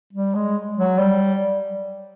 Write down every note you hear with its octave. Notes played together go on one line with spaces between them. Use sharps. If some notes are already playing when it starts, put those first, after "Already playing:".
G3
G#3
F#3
G3